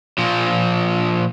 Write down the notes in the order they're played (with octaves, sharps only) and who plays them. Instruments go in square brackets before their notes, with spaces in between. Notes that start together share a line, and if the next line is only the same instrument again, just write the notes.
[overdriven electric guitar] A#2 F3